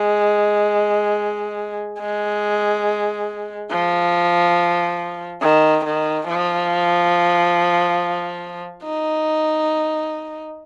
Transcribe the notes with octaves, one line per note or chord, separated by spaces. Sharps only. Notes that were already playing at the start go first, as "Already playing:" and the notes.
Already playing: G#3
G#3
F3
D#3
D#3
F3
D#4